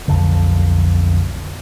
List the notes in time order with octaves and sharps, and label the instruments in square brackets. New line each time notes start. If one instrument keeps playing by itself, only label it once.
[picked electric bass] B1 F2 D3